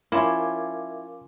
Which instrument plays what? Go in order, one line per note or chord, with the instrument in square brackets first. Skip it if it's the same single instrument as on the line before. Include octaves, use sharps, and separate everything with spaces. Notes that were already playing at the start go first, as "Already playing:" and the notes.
[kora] F3 C#4 F4 [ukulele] E4 [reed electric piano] A#4 F5 D6